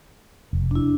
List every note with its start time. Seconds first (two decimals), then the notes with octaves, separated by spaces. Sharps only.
0.53 F1
0.71 D4 E4